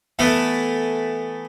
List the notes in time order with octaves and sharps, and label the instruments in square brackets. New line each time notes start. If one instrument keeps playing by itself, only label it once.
[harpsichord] E3 A3 B3